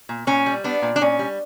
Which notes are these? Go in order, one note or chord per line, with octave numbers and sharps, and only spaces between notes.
A#2
A#2 C#4
G3
B3 D4
A#2
D4
A#2 C#4
G3